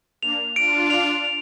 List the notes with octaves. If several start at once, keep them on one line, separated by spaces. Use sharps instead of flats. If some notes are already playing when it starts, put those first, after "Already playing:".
A#3 D4 F7
D4 F4 D7
F7
F7